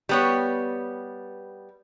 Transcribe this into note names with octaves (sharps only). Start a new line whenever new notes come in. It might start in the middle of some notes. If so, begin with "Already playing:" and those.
G3 B3 C#5